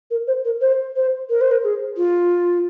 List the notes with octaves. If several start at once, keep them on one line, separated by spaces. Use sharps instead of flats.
A#4
C5
A#4
C5
C5
A#4
C5
A#4
G#4
F4